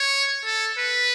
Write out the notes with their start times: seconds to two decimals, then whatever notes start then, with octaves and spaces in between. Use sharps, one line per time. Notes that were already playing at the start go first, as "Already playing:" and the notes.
Already playing: C#5
0.45 A4
0.78 B4